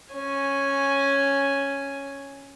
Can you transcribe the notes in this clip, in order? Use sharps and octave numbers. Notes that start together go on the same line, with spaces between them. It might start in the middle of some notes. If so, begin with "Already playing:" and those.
C#4 G#5